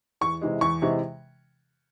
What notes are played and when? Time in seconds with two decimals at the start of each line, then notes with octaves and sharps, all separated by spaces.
0.21 E2 C#6
0.41 C3 E3 G#3
0.61 E2 C#6
0.82 C3 E3 G#3